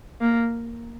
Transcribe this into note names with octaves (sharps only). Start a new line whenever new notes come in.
A#3